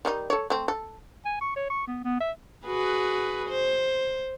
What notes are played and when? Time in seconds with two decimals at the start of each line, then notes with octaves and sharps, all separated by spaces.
0.05 D#3 G3 D#4
0.30 A4 C#5
0.50 A3 C4
0.68 A4
1.25 G#5
1.41 C#6
1.56 C#5
1.70 C#6
1.87 B3
2.04 B3
2.21 E5
2.66 F#4 G#4 B4
3.49 C5